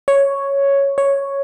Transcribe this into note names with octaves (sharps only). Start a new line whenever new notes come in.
C#5
C#5